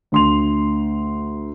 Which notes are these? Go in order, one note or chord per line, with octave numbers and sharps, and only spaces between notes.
D2 C6 F7